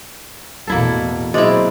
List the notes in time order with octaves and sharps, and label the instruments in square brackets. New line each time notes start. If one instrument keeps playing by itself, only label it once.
[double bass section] A1 E2 B2 [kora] A#3 E4 A4
[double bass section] B2 F#3 [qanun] G#3 C4 E4 [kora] D5